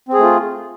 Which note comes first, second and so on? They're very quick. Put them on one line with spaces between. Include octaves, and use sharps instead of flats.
C4 G#4 A3 F4